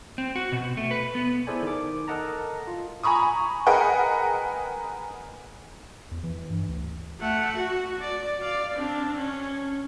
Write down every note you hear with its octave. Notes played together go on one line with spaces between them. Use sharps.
C4
F#4
B2
A3
B4
B3
E4 G#4 A4 C5 D5 G#5
D#3 D6
A4 A#4 D#5 F#5 A5 A#5
F4
G#5 A#5 B5 C#6 D#6
G#4 A#4 B4 D#5 F#5 G5
E2
E3
G2
D2
A3 F#5
F#4
D5
D5 F5
C4 D4
C#4